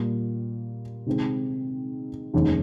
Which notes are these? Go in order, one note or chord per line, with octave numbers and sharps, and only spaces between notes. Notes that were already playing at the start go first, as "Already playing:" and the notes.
Already playing: A#2 G3 A#3 F4
C3 D#3 G#3 C4
F1 D#2 D#3 G#3 C#4